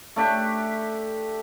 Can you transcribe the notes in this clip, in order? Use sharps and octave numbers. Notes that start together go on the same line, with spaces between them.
A3 D4 G4